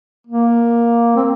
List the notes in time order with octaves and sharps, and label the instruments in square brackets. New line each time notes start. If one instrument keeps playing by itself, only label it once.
[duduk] A#3
C4